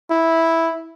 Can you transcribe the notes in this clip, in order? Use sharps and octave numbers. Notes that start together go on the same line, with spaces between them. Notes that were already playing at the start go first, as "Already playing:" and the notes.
E4